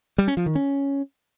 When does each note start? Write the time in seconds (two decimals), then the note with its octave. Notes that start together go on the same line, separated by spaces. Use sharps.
0.18 G3
0.28 C#4
0.37 F3
0.46 D#3
0.55 C#4